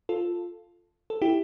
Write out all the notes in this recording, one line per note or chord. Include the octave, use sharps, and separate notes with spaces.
F4 A4
A4
E4 G4